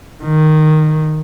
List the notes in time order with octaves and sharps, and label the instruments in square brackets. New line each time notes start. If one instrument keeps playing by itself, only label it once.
[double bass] D#3